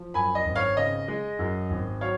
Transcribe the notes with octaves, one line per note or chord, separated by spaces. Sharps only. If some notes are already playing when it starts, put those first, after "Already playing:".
Already playing: F3
F#2 G#5 B5
D#5
G#1
C#5 F5
C#3 D#5
G#3
F#2
G#1
F#3 C#5 F5